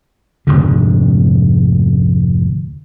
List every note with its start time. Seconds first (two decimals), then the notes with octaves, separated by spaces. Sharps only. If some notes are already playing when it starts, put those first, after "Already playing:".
0.47 F1 D2 G#2 D3